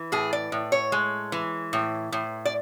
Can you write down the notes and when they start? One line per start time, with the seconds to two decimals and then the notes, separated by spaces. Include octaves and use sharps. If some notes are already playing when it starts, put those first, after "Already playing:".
Already playing: E3
0.12 A2 G#4
0.33 D5
0.52 A2
0.72 C#5
0.92 G#3
1.32 E3
1.73 A2
2.12 A2
2.45 D5